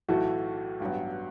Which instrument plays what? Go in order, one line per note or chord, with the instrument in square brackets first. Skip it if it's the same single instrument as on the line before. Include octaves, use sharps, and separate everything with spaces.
[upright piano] B1 A2 E3 A3 E4 [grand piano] F#4
[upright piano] A1 G2 F#3 B3